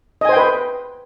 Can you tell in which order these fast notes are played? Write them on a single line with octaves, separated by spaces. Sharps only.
D#5 G#5 C5 G5 B4